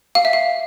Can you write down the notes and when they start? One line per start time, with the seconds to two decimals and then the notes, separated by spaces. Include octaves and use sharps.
0.15 F5
0.25 E5
0.33 F5